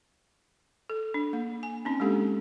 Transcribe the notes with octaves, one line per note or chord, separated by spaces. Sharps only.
A4
D4
A#3
G#5
C4 C#4 D#4
G#3 A#3 D4 G4 A4